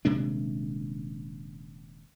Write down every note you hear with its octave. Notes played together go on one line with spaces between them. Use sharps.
D#1 C3 G#3 D4